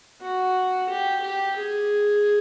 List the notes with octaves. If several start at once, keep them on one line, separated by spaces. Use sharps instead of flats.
F#4
G4
G4
G#4